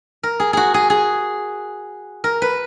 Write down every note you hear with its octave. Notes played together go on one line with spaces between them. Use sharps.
A#4
G#4
F#4 G#4
G#4
G#4
A#4
B4